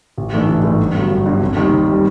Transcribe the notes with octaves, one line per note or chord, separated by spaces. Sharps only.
A1
G#2 E3 A3 D4
A1
G#2 E3 A3 D4
G1
G2 D3 F#3
G1
G2 D3 F#3
F1
D#2 D#3 G3
F1
D#3 G3